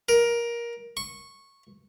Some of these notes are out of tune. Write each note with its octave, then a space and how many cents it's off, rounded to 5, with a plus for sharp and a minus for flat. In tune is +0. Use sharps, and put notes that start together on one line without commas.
A#4 +15
C#6 -10